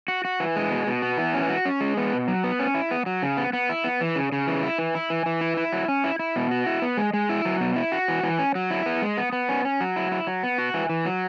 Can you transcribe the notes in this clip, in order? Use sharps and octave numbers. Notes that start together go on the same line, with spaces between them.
F#4
F#4
E3
G#3
B2
B2
B3
E3
C#4
F#4
C#4
G#3
B3
B2
F#3
B3
C#4
E4
B3
F#3
C#3
B3
B3
E4
B3
E3
C#3
C#3
E3
E4
E3
E4
E3
E3
E4
E4
F#3
C#4
E4
E4
B2
F#4
E4
B3
G#3
G#3
E4
F#3
B2
E4
F#4
E3
E3
C#4
F#3
E4
B3
G#3
B3
B3
C#4
C#4
F#3
E4
E4
F#3
B3
F#4
E3
E3
F#3